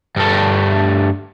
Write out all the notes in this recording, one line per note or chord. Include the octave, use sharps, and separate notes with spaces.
G2 A3